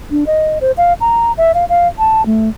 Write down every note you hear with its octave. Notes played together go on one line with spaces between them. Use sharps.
D4
D#5
C5
F5
A#5
E5
F5
F5
A5
A3